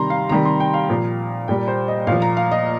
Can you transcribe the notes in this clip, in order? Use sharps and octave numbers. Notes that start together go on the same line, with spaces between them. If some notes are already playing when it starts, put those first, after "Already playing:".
Already playing: C3 D#3 G3 A#5 C6
F5
C3 D#3 G3 A#5
C6
G5
F5
A#2 F3
A#2 G3 G5
C5
D#5
A#2 F3 F5
A#5
F5
D#5